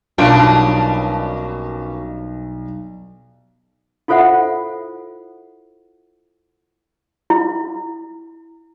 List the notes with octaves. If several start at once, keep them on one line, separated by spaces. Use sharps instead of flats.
B1 B2 G3 A#3 C#4 D4 F4 D7
E4 F4 A4 C5 E5 F#5
E4